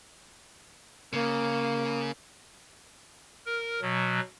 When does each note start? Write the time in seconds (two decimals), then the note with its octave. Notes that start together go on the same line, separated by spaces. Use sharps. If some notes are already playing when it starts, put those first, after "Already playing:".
1.13 C#3 A#3
3.46 A#4
3.81 B2 F#3